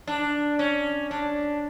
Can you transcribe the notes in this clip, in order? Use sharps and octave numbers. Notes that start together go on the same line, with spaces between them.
D4
C#4
D4